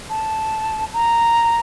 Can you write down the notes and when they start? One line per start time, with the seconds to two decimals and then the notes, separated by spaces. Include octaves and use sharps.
0.10 A5
0.93 A#5